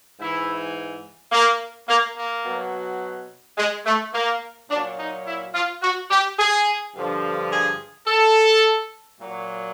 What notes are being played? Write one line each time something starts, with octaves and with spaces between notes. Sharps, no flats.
G#2 E3 E4
A#3
A#3
A#3
B2 F#3
G#3
A3
A#3
A#2 F#3 D4
D#4
E4
F4
F#4
G4
G#4
G2 D3 F3
G#4
A4
A#2 F#3